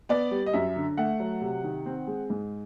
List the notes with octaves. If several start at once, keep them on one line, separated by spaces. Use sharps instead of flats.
B3 D5
G3
D#5
F#2 E5
D3
A3 F#5
F#3
C3
D#3
C4
G#3
G#2